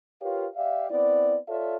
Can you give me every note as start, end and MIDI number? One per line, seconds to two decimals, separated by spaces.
0.21 0.46 65
0.21 0.46 67
0.21 0.46 70
0.21 0.46 71
0.21 0.46 73
0.21 0.46 77
0.55 0.87 67
0.55 0.87 74
0.55 0.87 76
0.55 0.87 77
0.90 1.37 59
0.90 1.37 60
0.90 1.37 64
0.90 1.37 74
1.48 1.77 65
1.48 1.77 69
1.48 1.77 73
1.48 1.77 74
1.48 1.77 76